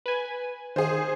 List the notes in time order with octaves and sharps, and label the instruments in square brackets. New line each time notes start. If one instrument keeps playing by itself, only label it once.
[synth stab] B4 G#5
[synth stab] D#3 [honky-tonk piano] G#4 C5